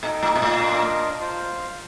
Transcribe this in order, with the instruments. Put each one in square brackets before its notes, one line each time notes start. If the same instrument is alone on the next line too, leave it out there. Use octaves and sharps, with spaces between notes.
[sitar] A#2 [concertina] D#4 A4 D#5 G5
[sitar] A2
A#2
A2
[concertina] D4 F4 A#4 D#5
F4 C5 F5